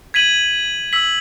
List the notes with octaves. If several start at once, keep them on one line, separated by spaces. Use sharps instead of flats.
G#6 B6 D#7 F#7
E6 B6 F#7